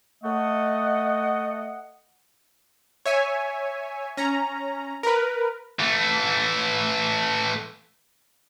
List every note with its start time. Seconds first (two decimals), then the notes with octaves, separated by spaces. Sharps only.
0.24 A3 D#5 F#5
3.06 C#5 E5 G#5
4.17 C#4 A#5
5.03 A#4 B4
5.79 E3 A3